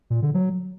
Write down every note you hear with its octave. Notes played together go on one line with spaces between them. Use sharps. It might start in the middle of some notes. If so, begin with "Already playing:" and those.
A#2
D3
F#3